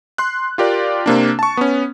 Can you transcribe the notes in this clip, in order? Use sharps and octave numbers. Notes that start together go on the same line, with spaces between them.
C6 F#6
F4 G4 A#4 D5
C3 A#3 D4
A5 C#6
B3 C#4